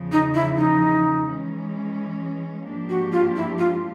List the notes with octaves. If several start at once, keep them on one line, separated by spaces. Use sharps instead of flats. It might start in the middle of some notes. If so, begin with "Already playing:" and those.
Already playing: E2 C#3 F3
D#4
E4
D#4
E3 G#3 C#4
G#2 F3 A#3 D4 G4
F#4
F4
E4
F4